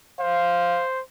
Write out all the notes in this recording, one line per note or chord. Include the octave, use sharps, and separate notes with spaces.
C5 F5